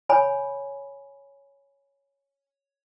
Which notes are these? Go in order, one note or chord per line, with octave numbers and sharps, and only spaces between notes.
C#5 G#5 B5